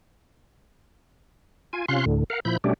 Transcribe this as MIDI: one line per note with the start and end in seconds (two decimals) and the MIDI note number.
1.73 1.85 65
1.73 1.85 80
1.88 2.05 48
1.88 2.05 61
1.88 2.05 65
1.88 2.05 77
1.88 2.05 84
1.88 2.05 90
2.06 2.24 38
2.06 2.24 45
2.06 2.24 50
2.30 2.40 70
2.30 2.40 77
2.30 2.40 78
2.45 2.57 46
2.45 2.57 53
2.45 2.57 64
2.45 2.57 83
2.45 2.57 91
2.64 2.74 47
2.64 2.74 55
2.64 2.74 57
2.64 2.74 61
2.64 2.74 62
2.64 2.74 67